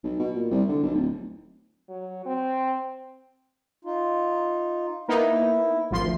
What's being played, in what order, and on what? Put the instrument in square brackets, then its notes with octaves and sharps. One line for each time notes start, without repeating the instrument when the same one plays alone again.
[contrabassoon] B1
B2
A#2
C2
D3
B1
D1
[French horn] F#3
C4
[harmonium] D#4 F4
[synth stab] A#3 B3 D#4 [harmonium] E4
[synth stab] G#1 F3 C6 [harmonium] D2